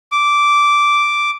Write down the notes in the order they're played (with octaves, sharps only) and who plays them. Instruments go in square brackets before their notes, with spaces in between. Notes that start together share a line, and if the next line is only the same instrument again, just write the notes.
[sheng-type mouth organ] D6